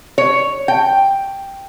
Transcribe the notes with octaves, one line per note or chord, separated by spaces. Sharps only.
C#5
G5